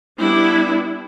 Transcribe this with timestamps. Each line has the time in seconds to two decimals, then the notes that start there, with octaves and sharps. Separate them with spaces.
0.18 G3 B3 D4 E4